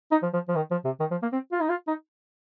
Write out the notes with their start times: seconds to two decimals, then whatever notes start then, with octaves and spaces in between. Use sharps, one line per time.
0.11 D#4
0.22 F3
0.33 F3
0.48 F3
0.56 D#3
0.71 F3
0.85 C3
1.00 D#3
1.11 F3
1.22 A#3
1.32 C4
1.52 F4
1.61 D#4
1.69 F4
1.87 D#4